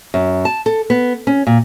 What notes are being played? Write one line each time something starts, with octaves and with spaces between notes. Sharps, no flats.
F#2
A5
A4
B3
C#4
A#2